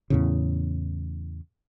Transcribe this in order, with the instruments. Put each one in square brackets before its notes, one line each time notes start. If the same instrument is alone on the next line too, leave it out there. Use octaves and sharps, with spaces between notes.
[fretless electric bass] E2 A2 C#3